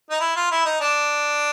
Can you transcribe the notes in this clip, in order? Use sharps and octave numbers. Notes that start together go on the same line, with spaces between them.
D#4
E4
F4
E4
D#4
D4